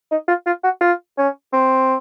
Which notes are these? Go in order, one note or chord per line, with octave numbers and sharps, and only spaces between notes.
D#4
F4
F4
F#4
F4
C#4
C4